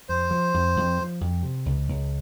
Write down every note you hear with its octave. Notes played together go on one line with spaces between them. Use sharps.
F2 C5
F3
F2
F2
F3
F2
C3
C#2
C#2